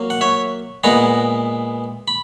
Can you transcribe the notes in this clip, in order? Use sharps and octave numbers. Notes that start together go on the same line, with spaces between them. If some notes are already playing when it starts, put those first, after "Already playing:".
Already playing: F#3 A#3
F#5
C#5 E5
A#2 G#3 B3 E4 F#5 A#5
B5